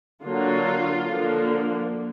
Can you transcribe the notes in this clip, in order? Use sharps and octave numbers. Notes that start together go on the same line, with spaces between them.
D3 F#3 A#3 F4
D3 F3 A#3